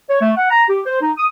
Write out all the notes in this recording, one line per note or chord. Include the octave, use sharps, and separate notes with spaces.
C#5
A3
F#5
A#5
G4
C5
D#4
D#6